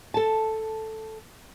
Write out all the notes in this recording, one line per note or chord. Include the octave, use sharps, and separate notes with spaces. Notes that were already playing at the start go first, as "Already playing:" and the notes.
A4 A5